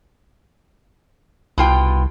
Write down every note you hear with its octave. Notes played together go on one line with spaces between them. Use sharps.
C2 B2 F4 G5